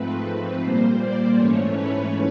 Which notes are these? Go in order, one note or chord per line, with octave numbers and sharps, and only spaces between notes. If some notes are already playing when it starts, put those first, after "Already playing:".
Already playing: G#2 F3 A3 C4 B4
B4
A#2 G3 A#3 C5
D5
G#2 E3 A3 C#4 C#5
B4